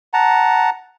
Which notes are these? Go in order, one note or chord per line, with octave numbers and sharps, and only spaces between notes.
F#5 A5 A#5